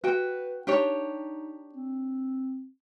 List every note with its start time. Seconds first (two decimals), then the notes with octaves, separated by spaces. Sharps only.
0.04 F#4 B4 G5
0.67 D4 D#4 G4 C#5
1.75 C4